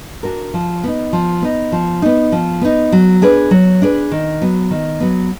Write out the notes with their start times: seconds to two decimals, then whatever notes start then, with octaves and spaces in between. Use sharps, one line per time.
0.23 D4 F#4 A#4
0.54 F3
0.84 B3 D#4
1.13 F3
1.42 B3 D#4
1.72 F3
2.02 B3 D#4
2.32 F3
2.61 B3 D#4
2.92 F#3
3.22 D4 G#4 B4
3.51 F#3
3.82 D4 G#4 B4
4.11 D#3
4.42 F#3 B3
4.71 D#3
5.00 F#3 B3